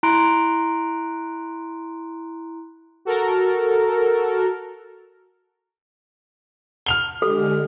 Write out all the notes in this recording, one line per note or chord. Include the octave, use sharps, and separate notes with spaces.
E4 A#5 C6 F#6 D7
F#4 A4 A#4
F6 F7 G7
D3 G#3 G4 A4